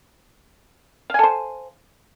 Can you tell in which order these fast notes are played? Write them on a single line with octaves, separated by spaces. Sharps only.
F5 G#5 A4 C5